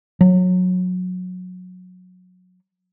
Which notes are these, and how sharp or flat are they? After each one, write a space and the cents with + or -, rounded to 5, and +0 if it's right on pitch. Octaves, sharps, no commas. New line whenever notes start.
F#3 -20